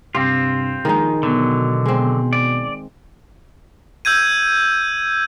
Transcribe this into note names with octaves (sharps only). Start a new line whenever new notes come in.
G2 C3 C4 F4 G4
A#1 D#3 G#3 D#4
B2 D3 F#3
G#3 C4
D5
E6 G6 G#6 D#7